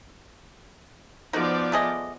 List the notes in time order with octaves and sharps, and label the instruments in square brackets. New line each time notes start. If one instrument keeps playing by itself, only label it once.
[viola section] F3 B3 D5 [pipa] D#4 F#4
[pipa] A3 G#4 D#5